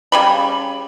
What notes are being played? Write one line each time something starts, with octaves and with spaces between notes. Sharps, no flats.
C#3 G3 B5